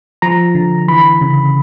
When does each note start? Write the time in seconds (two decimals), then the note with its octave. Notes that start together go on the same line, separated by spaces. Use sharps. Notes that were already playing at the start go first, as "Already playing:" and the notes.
0.22 F3 A#5
0.55 D3
0.88 E3 B5
1.21 C#3